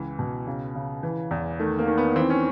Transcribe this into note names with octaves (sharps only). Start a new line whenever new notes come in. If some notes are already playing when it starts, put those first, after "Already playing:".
Already playing: C#2 E3
B2
C#3
C#3
E3
E2
D#3 A3
A#3
D#3
B3
E3 C4
C#4